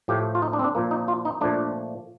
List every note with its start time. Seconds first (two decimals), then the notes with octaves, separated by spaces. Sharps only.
0.08 A2 F3 A3 G4
0.35 F4
0.42 D#4
0.53 D4
0.59 C4
0.64 D4
0.75 A#2 F3 A#3
0.91 D#4
1.08 F4
1.25 D#4
1.41 A#2 F3 A3 D4